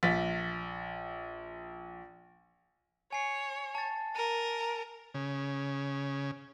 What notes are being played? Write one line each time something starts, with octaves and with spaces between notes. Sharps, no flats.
A#1 A6 B6
C#5 G#5 C7
A5 A6
A#4 D#7
C#3